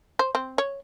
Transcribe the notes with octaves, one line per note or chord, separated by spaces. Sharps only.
C5
C4
C#5